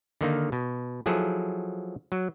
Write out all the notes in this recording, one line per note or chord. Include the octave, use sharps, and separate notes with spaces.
D3 D#3 A#3 D#4
B2
F3 F#3 E4 G#4 A4
F#3